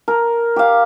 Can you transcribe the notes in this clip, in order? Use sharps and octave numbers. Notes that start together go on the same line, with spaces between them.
A#4
G4 F5